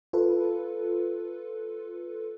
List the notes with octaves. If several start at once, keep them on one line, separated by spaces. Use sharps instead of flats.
F4 A4 B4